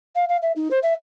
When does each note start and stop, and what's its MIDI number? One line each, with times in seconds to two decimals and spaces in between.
0.15 0.25 77
0.29 0.37 77
0.42 0.52 76
0.56 0.68 63
0.71 0.79 72
0.83 0.93 76